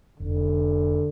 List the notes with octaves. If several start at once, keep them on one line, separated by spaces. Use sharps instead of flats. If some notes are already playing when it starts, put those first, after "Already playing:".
F1 D3